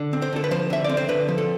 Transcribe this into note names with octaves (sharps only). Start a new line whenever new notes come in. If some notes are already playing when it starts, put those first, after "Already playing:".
Already playing: D3
C4
C5
D3 A4
B4
F3 C5
D3 E5
D5
C4
C5
D3 B4
F3
A4